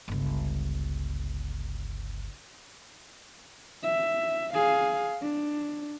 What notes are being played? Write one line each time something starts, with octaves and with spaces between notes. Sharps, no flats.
G1 C#2
E5
G#4 F5
D4